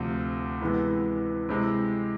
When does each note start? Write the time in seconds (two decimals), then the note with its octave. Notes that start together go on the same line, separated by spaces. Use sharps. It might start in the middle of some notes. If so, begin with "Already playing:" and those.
Already playing: D2 C3 F3
0.61 C3 E3 G#3 B3 E4
1.49 C3 G#3 C4 E4